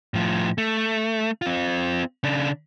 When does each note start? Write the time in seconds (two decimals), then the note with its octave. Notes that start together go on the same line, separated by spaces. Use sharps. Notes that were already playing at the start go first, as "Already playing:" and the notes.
0.14 A2 F3
0.58 A3
1.42 C4 F4
2.24 C#3 D4